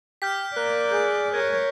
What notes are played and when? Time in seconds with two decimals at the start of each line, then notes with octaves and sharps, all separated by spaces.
0.22 G4 F6 G6 B6
0.56 A#3 D5 F#6
0.92 G#4 G6
1.33 A#4 C#5 G#5